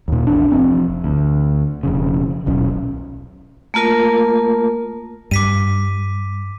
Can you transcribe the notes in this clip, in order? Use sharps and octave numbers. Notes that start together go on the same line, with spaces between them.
D#2 A#2
A#1 E2 D4
F1 F2 C4
D2
E1 F2 C#3
D#1 B1 C#4
A3 A#3 F4 A#4
G2 D6 B6 D#7